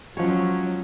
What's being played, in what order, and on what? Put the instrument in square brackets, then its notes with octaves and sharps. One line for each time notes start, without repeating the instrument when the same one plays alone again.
[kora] F3 G#3 C#5 [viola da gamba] F#3 C#4